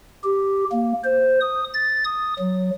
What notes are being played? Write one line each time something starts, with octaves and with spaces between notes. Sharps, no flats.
G4
A#3
C5
D#6
A6
D#6
F#3